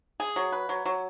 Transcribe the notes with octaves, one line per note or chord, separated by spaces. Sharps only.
G#4
F#3
B4
F#3
F#3